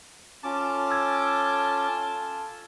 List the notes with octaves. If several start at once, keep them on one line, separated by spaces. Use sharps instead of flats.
C#4 F4 A4 A5 D6
E6 G#6